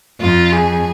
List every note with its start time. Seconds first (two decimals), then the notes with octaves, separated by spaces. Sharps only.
0.20 F2 F4
0.52 G#4